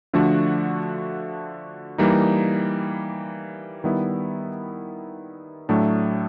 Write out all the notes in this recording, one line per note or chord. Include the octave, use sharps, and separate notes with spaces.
D3 F3 A3 D4 F#4
E3 G3 A#3 D#4
D#3 G3 B3 E4
A2 F#3 A3 D4